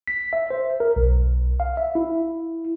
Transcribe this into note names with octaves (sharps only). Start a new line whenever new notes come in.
B6
E5
C5
A#4
B1
F5
E5
E4